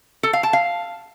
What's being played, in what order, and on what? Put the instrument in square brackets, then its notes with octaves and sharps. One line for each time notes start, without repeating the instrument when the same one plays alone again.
[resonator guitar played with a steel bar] A4
F5
A5
F5